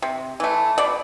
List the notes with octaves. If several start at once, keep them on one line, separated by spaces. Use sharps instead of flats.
C3
E3 A3
B2 D5